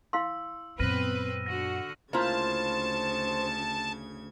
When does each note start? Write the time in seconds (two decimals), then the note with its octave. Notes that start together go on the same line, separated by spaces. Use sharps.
0.13 E4 F5 C6 E6
0.80 F#2 A#2 B3 C4 B4 F6 A#6 D#7
1.46 D3 F#4 A#6
2.13 D2 C#3 A#3 E4 F4 C5 A5 G#6